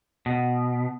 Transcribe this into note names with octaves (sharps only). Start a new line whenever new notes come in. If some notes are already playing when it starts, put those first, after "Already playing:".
B2